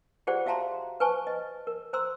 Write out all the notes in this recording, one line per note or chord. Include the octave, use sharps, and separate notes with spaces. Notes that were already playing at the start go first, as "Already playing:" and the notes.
F4 G4 G#4 C5 D5 F#5
F#4 E5 F5 A5 A#5 C6
B4 C5 G#5 A5 C#6
D#5
A#4
C5 A#5 C6 E6